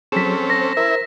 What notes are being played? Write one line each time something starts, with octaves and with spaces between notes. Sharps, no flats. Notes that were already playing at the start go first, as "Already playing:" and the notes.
F#3 C4 C#4 G#4 A4 B6 E7
C5 A#6
E4 A#4 C5 E5